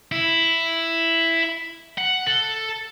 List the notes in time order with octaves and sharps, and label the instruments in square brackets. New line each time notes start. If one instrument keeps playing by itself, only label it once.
[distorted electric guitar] E4
F#5
A4